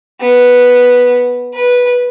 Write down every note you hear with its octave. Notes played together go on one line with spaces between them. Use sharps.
B3
B4